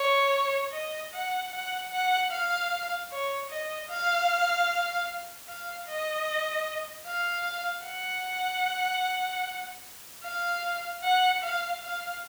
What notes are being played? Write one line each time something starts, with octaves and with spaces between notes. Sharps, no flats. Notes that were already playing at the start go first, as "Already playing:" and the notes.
Already playing: C#5
D#5
F#5
F#5
F#5
F5
C#5
D#5
F5
F5
D#5
F5
F#5
F5
F#5
F5
F5